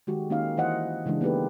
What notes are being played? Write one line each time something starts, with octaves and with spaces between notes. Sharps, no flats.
D#3 G#3 F#4 G4
D#3 A#3 C#4 D#4 G4 F5
E3 E4 C5 D#5 F#5
C#3 E3 G#3 D4
A#3 B3 D#4 G4 A4 B4